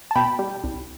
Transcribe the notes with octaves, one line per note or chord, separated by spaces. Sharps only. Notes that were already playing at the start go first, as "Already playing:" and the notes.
A5
B2 G5 B5
G3
C2